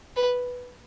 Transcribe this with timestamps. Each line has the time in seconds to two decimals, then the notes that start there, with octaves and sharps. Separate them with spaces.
0.16 B4